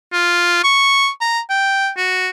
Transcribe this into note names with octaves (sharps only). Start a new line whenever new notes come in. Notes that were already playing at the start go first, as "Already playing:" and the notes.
F4
C#6
A#5
G5
F#4